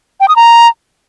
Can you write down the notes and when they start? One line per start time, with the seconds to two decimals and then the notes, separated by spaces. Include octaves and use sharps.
0.20 G5
0.28 D#6
0.36 A#5